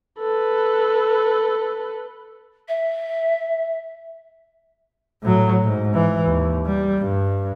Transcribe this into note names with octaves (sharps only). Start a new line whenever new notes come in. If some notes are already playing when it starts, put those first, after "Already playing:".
A4 B4
E5
A2 F#3
G#2
E3
D#2
G3
G2